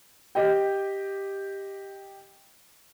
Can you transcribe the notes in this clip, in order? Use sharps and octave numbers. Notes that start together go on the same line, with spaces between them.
G4 D#5 G5